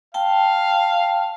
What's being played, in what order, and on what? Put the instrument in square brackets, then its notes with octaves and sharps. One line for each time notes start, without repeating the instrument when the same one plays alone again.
[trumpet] F5 [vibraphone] G5 A5